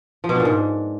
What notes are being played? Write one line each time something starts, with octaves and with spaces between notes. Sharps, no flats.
F3
B2
D4
A#2
G#2